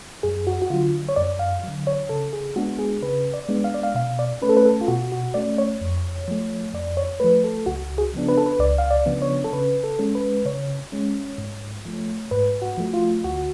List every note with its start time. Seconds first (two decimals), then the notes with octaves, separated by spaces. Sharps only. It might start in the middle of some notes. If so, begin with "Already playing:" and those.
0.23 F#2 G#4
0.47 F#4
0.62 F#4
0.70 D3 F#3 F4
1.09 C#5
1.16 F#2 D5
1.39 F5
1.63 D3 F#3
1.87 C#5
2.09 C#3 A4
2.33 G#4
2.56 G#3 B3 D4 F#4
2.79 G#4
3.02 C#3 B4
3.34 D5
3.49 G#3 B3 D4
3.64 F5
3.74 D5
3.83 F5
3.95 B2 F5
4.19 D5
4.42 A3 C#4 B4
4.49 A4
4.57 B4
4.66 A4
4.81 F4
4.88 B2 F#4
5.12 F#4
5.34 A3 C#4 D5
5.58 C#5
5.81 F2
6.28 F3 A3
6.74 F2 D5
6.97 C#5
7.20 F3 A3 B4
7.44 A4
7.66 C#2 F#4
7.98 G#4
8.14 C#3 F3 B3 D4
8.29 B4
8.37 A4
8.46 B4
8.59 C#2 D5
8.78 F5
8.91 D5
9.06 C#3 F3 B3 D4
9.22 C#5
9.44 A4
9.53 C#3 B4
9.84 A4
9.99 G#3 C#4
10.15 B4
10.45 C#3 C#5
10.92 G#3 C#4
11.38 G#2
11.85 F3 A3
12.31 G#2 B4
12.62 F#4
12.78 F3 A3
12.94 F4
13.24 D2 F#4